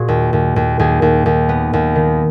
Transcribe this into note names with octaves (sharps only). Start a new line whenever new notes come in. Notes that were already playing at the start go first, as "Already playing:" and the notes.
Already playing: A#2 F#4 G#4
D#2
D#2
D#2
D#2 G#4
D#2
D#2
B3
D#2
D#3